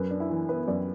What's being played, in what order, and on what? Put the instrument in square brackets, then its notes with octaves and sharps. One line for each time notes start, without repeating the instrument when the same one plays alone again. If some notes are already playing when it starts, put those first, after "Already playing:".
Already playing: [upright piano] F#2 B4
D4
E4
E3
B3 B4
F#2 D5